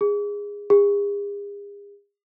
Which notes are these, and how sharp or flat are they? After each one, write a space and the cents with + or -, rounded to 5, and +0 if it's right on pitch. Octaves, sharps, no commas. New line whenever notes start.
G#4 -20
G#4 -45